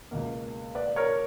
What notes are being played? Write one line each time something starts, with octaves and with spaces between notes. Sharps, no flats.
C#2 B2 A#3
B4 D5
A#4 C#5